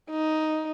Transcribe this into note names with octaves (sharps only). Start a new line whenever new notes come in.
D#4